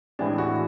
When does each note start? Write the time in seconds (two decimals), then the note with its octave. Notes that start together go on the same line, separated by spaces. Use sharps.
0.19 A2 E3 G#3 D4
0.38 F#4